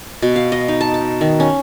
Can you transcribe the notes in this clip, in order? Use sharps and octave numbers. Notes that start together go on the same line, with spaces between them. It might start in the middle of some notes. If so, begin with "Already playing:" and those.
B2
F5
D#5
D#4
A5
A5
D#3
C#4